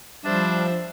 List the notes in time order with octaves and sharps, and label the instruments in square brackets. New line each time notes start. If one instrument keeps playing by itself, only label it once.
[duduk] F3 [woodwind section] G3 [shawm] D4 [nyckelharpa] C5 E5